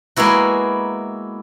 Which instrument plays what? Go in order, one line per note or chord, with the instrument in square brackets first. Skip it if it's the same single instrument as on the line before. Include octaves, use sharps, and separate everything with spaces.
[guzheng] G#3 A#3 B3 E4 F#4